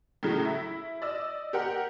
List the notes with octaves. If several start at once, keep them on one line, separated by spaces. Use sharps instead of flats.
A2 C#3 F#3
E4
D5 D#5 E6
G4 A#4 F#5